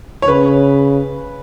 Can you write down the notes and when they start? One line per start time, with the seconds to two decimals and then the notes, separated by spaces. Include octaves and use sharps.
0.22 C#5
0.27 C#3 B4